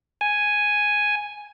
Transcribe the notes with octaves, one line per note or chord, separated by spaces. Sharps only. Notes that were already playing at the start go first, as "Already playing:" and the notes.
G#5